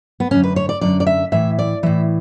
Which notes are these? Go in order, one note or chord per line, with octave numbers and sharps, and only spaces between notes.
B3
F#2 D3 C#4
B4
C#5
D5
F#2 D3 D5
D5
E5
A2 E3 E5
D5
A2 E3 E5